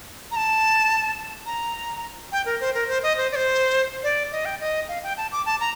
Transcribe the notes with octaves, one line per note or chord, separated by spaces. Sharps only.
A#5
A5
A#5
G5
A#4
C5
A#4
C5
D#5
C5
D5
C5
D5
D#5
G5
D#5
F5
G5
A5
D6
A5
A#5